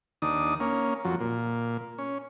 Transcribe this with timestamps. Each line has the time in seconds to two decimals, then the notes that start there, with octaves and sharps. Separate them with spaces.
0.22 D#2 D4 D#6
0.60 A#3 C#4
1.05 F2 F#3
1.20 A#2
1.98 C#4